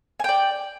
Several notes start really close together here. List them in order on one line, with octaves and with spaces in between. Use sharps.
G#5 G5 D5